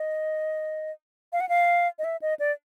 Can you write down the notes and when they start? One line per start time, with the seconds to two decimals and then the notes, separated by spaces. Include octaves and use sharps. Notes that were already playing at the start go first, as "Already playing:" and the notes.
Already playing: D#5
1.33 F5
1.40 F#5
1.49 F5
1.99 D#5
2.04 E5
2.22 D#5
2.39 D5